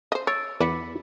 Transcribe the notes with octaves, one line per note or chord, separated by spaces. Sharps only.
C5 D#5
C#5 E6 A6 D7
E2 B3 E4 B4 D6 B6 C#7